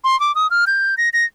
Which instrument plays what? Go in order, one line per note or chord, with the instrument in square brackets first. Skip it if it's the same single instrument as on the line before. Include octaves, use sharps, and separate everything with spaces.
[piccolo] C6
D6
D#6
F6
G6
A#6
A#6